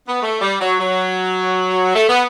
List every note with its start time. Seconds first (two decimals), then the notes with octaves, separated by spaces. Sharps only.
0.08 B3
0.22 A3
0.41 G3
0.61 F#3
0.79 F#3
1.95 A3
2.09 B3